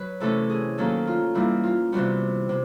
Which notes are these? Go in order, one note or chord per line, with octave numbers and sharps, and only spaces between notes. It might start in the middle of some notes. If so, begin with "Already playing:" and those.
Already playing: F#3 B4
C3 E3 A3 C#4 A4
G#4
D#3 F#3 A#3 C#4 A4
F4
E3 G3 A#3 E4
F4
C3 E3 G3 B3 F#4
C3